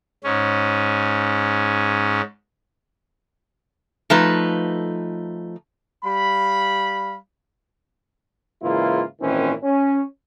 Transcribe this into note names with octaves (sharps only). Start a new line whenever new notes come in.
G#2 C#4
F3 A3 D#4 B4
G3 F5 B5
G#2 C#3 E3 A#3 E4 F4
G#1 A#2 D#3 E3 C4 C#4
C#4